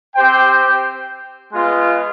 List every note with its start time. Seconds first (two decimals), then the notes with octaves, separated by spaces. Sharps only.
0.14 C4 G4 C5 G5
1.52 G#3 B3 F4